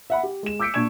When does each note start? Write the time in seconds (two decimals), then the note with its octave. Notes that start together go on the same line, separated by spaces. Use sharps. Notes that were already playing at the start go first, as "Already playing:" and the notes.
0.10 E5 F#5 B5
0.23 G4
0.43 G#3 E7
0.60 D6 E6 G6 B6 C#7 D7
0.74 A#2 D4 C#6 G#6 E7